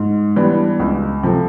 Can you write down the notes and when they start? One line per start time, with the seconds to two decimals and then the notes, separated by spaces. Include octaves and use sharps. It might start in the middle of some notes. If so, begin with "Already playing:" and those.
Already playing: G#2
0.36 E3 G3 B3 D4
0.80 C#2
1.23 C3 F3 A3